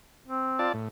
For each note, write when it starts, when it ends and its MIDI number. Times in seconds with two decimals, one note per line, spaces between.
0.28 0.69 60
0.59 0.73 65
0.59 0.73 74
0.59 0.73 81
0.74 0.88 45